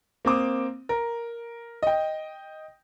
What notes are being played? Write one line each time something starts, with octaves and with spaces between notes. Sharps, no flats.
A#3 C4 D6 D#6
A#4
D#5 G5